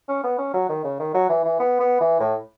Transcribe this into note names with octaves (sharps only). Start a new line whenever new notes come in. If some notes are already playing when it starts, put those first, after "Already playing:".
C#4
B3
C#4
F#3
D#3
C#3
D#3
F#3
E3
E3
B3
B3
E3
A2